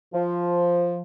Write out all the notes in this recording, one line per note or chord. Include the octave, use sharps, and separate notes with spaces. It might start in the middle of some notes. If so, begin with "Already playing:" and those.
F3